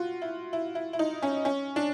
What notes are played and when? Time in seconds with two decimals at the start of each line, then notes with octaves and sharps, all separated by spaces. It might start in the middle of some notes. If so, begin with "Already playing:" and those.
Already playing: F4 F#4
0.22 E4
0.53 E4
0.75 E4
0.93 E4
0.99 D#4
1.22 C#4
1.45 C#4
1.76 D4